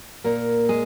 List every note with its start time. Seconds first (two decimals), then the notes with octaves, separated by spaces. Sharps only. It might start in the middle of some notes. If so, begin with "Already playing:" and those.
0.24 A#2 A#3 A#4
0.69 G#3 G#4